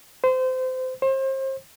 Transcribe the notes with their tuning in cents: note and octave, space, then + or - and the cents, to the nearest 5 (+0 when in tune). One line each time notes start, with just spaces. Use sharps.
C5 -25
C5 +35